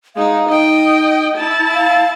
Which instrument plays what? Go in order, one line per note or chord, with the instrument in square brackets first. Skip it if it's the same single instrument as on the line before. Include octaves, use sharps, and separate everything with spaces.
[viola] G#3 D#4 [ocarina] F5
[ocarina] D#4 [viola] D#5 G5
[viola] E4 A5
[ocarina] F5